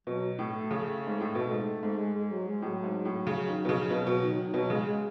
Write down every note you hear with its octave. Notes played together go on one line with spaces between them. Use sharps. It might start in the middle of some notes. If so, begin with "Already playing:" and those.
B2 F#3
A2
A3
C#3
G#2
A2
B2
G#2
G#2
G#3
G#3
F#3
G#3
A2 F#3
G#2
A2
C#3
D#3
B2
C#3
B2
B2
D#3
D#3
B2 F#3
C#3 G#3
G#3